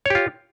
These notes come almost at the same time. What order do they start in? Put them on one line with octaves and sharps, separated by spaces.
C#5 G4 F4